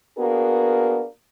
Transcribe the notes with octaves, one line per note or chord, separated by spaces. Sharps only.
A#3 B3 D4 F#4 G#4 A#4